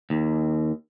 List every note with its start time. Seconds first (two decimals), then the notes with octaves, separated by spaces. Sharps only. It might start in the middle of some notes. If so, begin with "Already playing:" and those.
0.10 D#2